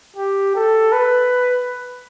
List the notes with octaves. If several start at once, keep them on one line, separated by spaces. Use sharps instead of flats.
G4
A4
B4